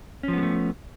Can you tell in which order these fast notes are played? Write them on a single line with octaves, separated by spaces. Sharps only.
C#4 F3 B3 G#3 A3